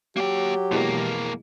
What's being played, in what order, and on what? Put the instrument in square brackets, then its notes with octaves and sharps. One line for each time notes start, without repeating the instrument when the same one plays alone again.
[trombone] F#3 [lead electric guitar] A#3 G5 [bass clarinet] G4
[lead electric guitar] F2 A#3 [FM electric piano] B2 E3 G#3